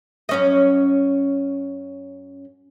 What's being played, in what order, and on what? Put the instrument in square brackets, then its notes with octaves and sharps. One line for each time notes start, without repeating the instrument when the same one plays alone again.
[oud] F#2 C#4 D#5